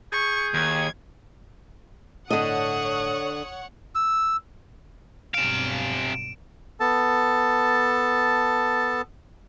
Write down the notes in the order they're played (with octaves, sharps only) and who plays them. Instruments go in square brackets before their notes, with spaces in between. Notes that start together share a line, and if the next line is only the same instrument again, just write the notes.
[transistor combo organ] G#4 [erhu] C#6 [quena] G6
[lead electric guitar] D#2 [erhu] G#6
[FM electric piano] G1 A2 A5 [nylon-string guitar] D3 D#5 [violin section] C#5 F#5 [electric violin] D#6
[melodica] E6
[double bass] B1 G2 [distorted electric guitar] C3 F5 [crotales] D7 E7
[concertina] B3 A4 A5